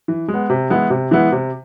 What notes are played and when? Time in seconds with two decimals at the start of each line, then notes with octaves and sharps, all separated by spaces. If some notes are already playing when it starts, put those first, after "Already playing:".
0.08 E3
0.28 G#3
0.34 B3
0.50 C3
0.70 E3 G#3 B3 E4
0.90 C3
1.11 E3 G#3 B3 E4
1.32 C3